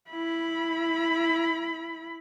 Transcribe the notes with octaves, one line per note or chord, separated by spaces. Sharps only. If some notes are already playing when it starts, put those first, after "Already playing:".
E4 B5